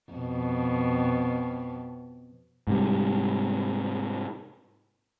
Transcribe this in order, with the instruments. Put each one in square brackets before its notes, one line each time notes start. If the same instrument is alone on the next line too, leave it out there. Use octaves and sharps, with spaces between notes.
[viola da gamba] F2 B2
[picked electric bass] G#2 C3 G3